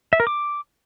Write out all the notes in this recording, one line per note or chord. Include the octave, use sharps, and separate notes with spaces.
E5
A#4
D6